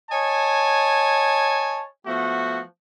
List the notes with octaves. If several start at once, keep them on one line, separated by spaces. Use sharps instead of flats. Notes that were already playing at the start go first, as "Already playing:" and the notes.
C#5 D#5 G#5 A5
F3 A3 B3 F#4